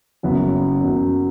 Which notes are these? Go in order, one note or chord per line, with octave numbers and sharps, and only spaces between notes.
F#1 F#2 F#3 B3
F#1 F#2 F#3 B3